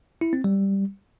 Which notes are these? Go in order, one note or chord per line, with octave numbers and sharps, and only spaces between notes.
E4
C4
G3